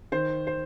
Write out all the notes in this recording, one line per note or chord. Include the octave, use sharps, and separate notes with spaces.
D#3 C5
C5